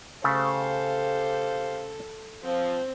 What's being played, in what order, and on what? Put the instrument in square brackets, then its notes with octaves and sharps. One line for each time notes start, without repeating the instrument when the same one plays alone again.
[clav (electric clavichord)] C#3 A3 [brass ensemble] G4 C5 F5 [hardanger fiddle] A4
[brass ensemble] F3 [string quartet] C4